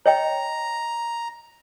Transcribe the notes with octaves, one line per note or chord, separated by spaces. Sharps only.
C#5 D#5 G5 A#5